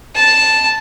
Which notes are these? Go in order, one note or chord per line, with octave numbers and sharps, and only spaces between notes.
A5